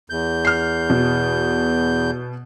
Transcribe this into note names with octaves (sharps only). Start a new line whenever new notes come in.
E2 G6
F6 C7
B2